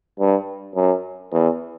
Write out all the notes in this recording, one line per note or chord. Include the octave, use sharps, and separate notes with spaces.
G2
F#2
E2